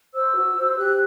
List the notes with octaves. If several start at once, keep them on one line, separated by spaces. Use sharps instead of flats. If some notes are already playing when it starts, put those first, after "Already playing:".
C5 E6
F#4
C5
G4 F#6